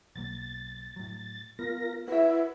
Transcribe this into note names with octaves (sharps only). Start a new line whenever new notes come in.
B1 F#3 A#3 A6
A2 F#3
B3 F4 A#4 A#6
E4 F#4 B4 E5